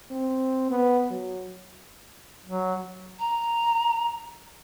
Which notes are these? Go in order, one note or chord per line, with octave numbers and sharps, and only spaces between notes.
C4
B3
F#3
F#3
A#5